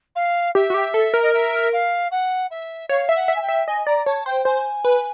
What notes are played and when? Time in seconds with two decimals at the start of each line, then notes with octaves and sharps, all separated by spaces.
0.15 F5
0.55 G4 E5
0.70 F#4
0.74 G4
0.94 A4
1.14 A#4
1.22 D#5
1.33 E5
1.72 F5
2.11 F#5
2.50 E5
2.89 C#5 F5
3.09 E5
3.15 F#5
3.28 E5
3.35 G#5
3.42 G5
3.48 E5
3.67 D#5 G#5
3.86 D5 A#5
4.06 C#5 A5
4.26 C5 G5
4.45 C5 G#5
4.84 B4